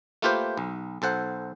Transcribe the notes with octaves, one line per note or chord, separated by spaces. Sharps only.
A3 A#3 F4 G4 B4 C5
B1
B1 A4 C5 F#5